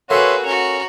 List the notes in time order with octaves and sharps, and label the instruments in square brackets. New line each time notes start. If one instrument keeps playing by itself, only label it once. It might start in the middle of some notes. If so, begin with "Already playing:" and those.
[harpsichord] A#3 A4 [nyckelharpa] F#4 B4 [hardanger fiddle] G#4 [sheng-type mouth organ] C#5 E5 C6
[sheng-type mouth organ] C#4 [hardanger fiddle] F#4 A#5 [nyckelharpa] C#5